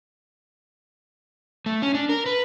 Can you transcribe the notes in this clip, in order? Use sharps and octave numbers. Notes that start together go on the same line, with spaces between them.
A3
C#4
D4
A#4
B4